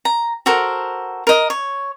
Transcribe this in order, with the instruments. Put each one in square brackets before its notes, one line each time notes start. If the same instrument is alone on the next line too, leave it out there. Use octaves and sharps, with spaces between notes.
[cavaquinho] A#5
F#4 A4 A#4 C5
A#4 D#5
C#5